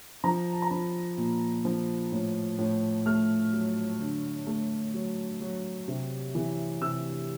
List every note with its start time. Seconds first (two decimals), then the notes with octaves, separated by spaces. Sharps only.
0.24 F3 A#5
0.53 A5
0.62 A#5
0.71 F3 B5
1.18 A#2
1.65 F3
2.12 A2
2.58 A2
3.06 A3 F6
3.53 F#3
4.00 D3
4.47 A3
4.94 F#3
5.41 F#3
5.88 C3
6.35 E3
6.81 C3 E6